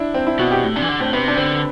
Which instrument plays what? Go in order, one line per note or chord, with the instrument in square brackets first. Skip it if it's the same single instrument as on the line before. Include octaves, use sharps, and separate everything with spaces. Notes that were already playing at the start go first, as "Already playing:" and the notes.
Already playing: [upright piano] D4 E4
C4
E4
[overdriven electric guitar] B2 [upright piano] F#4
[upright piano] G4
[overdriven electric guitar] A2
[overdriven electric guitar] C3 [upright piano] D4
[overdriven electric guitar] E3
D3
[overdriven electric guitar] A2 [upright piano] C4
[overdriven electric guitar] C3 [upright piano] B3
[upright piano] D4
[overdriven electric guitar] D3 [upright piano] C4